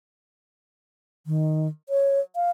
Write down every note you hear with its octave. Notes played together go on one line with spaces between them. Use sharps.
D#3
C#5
F5